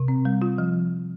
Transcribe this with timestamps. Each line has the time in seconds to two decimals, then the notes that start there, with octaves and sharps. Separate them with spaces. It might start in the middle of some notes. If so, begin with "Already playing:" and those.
Already playing: C3
0.08 C4
0.25 G3
0.42 F4
0.58 F3